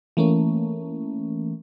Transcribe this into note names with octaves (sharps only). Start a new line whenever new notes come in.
E3 A3 A#3 C#4